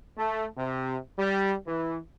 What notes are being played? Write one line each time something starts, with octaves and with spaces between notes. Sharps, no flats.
A3
C3
G3
E3